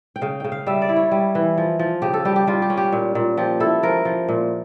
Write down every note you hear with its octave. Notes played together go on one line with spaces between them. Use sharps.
G5
C#3 F5
C#3 G5
F5
G3 E5
D5
E4
C#5
G3
E3
F3
F3
C#3 G4
A4
G3 G4
G4
G3 F4
G4
C#4
G4
A#2
A#2
F3 G4
E4 A4
F3 A#4
F3
A#2